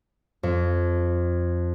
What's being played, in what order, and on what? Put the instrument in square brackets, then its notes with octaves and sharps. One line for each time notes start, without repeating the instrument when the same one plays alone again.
[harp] F2